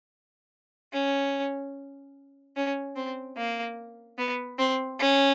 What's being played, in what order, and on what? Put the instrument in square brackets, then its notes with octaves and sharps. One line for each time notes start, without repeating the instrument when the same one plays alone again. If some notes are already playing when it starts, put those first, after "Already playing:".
[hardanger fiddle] C#4
C#4
C4
A#3
B3
C4
C#4